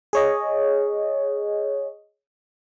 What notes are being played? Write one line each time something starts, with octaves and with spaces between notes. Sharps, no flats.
G#4 C#5 D#5